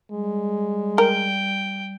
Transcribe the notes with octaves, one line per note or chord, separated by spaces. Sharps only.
G3 G#3
A#4 G5